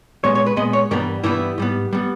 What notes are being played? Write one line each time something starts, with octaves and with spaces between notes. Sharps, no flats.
A#2 G#3 B3 C#5
C#5
B4
A#2 G#3 B3 D#5
C#5
G2 E3 G3 B3 A#4
G2 E3 G3 B3 E4
G#2 G3 B3
G3 B3